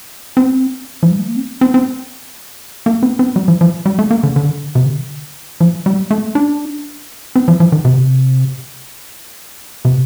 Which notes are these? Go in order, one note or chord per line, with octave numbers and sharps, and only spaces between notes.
C4
F3
G3
A3
A#3
C4
C4
C4
A#3
C4
C4
G3
F3
F3
G3
A3
A#3
D3
D3
C3
D3
F3
G3
A3
D4
C4
F3
F3
D#3
C3
C3